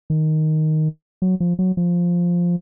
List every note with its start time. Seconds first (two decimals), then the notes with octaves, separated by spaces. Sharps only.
0.10 D#3
1.22 F#3
1.40 F3
1.59 F#3
1.77 F3